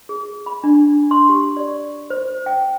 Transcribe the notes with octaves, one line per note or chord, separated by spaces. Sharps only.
G#4
B5
D4
C6
G4
D5
C5
G5